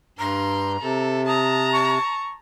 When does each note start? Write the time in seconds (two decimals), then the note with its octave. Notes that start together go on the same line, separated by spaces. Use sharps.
0.19 G2 A#5 C6
0.82 C3 A4
1.27 A5 A#5 D#6
1.72 C#6